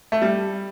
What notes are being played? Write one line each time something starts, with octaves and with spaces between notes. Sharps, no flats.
A3
G3